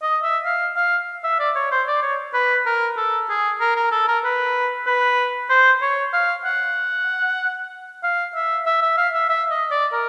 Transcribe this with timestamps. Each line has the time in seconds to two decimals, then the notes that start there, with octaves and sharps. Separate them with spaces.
0.03 D#5
0.23 E5
0.45 F5
0.76 F5
1.24 E5
1.40 D5
1.56 C#5
1.72 C5
1.88 D5
2.03 C#5
2.34 B4
2.66 A#4
2.97 A4
3.29 G#4
3.60 A#4
3.76 A#4
3.92 A4
4.08 A#4
4.24 B4
4.87 B4
5.50 C5
5.82 C#5
6.13 F5
6.45 F#5
8.04 F5
8.35 E5
8.66 E5
8.82 E5
8.98 F5
9.14 E5
9.30 E5
9.51 D#5
9.71 D5
9.92 A#4